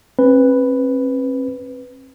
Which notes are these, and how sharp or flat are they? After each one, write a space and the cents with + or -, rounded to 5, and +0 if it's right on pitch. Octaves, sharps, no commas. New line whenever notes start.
C4 +45 B4 +0